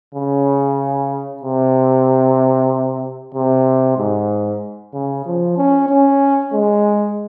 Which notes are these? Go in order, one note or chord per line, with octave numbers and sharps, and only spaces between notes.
C#3
C3
C3
G#2
C#3
F3
C#4
C#4
G#3